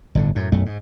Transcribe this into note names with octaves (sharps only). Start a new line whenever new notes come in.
G1 A2 D3
F#2 A2
B1 F#2 A3
G#2